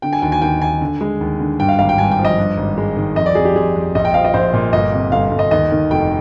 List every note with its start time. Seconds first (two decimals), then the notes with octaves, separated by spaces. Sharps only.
0.02 D3 G5
0.13 G#5
0.22 D#2 G5
0.32 G#5
0.42 D#2 G5
0.61 D#2 G#5
0.81 D3
1.01 G#3
1.21 D#2
1.40 D3
1.59 G2 G5
1.69 F5
1.79 G#1 F5
1.89 G5
1.98 G2 G#5
2.11 G5
2.19 F3
2.25 D#5
2.38 G2
2.57 G#1
2.77 G#3
2.97 D#3
3.16 F2 D#5
3.26 D5
3.35 F2 G#4
3.45 G4
3.56 F2 G#4
3.76 F2
3.95 A#1 D#5
4.05 G5
4.14 F3 F5
4.24 D#5
4.34 A#1 C5
4.53 A#2
4.73 G1 D#5
4.93 C3
5.12 G1 F5
5.31 G1
5.39 D#5
5.51 D#2 D#5
5.71 D#3
5.90 F1 G5